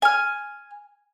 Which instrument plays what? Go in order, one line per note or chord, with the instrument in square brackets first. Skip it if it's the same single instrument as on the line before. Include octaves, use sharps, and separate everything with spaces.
[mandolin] G#5 F6